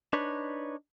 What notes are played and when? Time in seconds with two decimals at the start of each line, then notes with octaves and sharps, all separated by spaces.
0.13 D4 D#4 B4 C#5